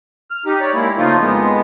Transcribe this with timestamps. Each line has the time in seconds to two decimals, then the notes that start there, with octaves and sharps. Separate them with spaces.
0.31 F6
0.46 D#4 G4
0.60 C#5 D5
0.74 G#3 A#3 E4
0.97 C#3 F3 A3 A#3 D#4 F4
1.20 F2 G#3 B3